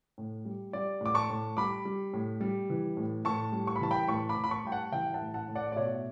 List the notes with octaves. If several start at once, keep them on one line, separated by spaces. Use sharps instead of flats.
A2
G3
G3 D5
A2 D6
A5 C#6
A2
G3 B5 D6
G3
A2
G3
E3
A2
A2 A5 C#6
G3
C#6
B5
E3 A5
G5 B5
A2 A5 C#6
B5 D6
A2
B5
A5 C#6
G3 G5
F#5 A5
E3 E5 G5
F#5 A5
A2
F#5 A5
A2
D5 F#5
D5
B2 C#5 E5